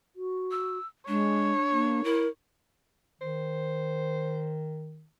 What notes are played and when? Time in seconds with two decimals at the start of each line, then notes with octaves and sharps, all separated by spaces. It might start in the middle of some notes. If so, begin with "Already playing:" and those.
0.16 F#4
0.51 E6
1.08 G#3 D4 C#5
1.72 A#3
2.05 E4 A#4
3.21 D#3 C5